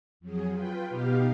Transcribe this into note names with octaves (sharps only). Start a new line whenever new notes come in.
F2 F#3 G#4
F4 B4 G5
B2 B3 D#4 G4 F5